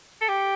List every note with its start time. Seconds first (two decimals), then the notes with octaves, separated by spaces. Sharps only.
0.22 A4
0.29 G4